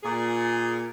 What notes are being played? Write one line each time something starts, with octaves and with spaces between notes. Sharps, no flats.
A#2 G#4